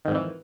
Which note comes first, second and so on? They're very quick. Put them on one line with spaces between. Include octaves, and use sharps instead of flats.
D#3 G#2 F2 E3